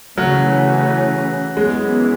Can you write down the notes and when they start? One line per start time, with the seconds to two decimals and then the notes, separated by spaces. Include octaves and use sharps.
0.18 C#3 E3 F#3 A3 C#4
1.57 F#2 E3 G#3 B3